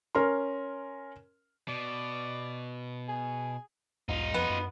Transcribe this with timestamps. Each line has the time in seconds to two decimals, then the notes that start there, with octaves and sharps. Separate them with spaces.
0.15 C#4 A#4 C6
1.68 B2 D5
3.08 G#4
4.09 B1 E2 G#2 D#4 F4
4.34 F2 F3 B3
4.50 F#2